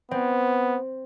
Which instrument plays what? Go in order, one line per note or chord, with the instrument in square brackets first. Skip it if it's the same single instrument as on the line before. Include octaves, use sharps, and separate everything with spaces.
[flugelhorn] B3 [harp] C4